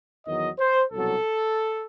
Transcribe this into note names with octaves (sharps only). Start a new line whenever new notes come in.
E2 D#3 F#3 D#5
C5
C2 B2 F#3 A4